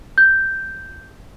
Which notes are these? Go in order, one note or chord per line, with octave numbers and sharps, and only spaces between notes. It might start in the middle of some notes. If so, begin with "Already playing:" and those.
G6